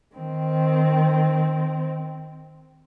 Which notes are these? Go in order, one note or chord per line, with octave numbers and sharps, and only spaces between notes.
D#3 C4